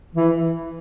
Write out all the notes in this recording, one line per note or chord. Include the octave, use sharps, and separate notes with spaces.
E3